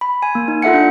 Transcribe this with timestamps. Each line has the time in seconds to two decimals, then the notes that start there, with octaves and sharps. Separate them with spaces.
0.01 B5
0.22 G#5
0.35 A#3
0.48 D#4
0.62 F4 A4 E5 F#5 C#7
0.74 D4